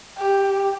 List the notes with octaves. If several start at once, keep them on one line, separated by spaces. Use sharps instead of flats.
G4